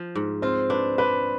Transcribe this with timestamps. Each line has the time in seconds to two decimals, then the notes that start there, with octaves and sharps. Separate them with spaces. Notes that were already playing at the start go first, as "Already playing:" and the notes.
Already playing: F3
0.15 G#2
0.42 C4 F4 C5
0.70 D4 B4
0.98 D4 B4